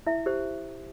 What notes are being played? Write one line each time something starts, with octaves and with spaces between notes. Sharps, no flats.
E4 E5
G4 C5